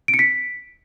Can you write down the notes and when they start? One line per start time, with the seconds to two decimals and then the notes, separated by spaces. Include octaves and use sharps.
0.08 D7
0.14 C#7
0.19 B6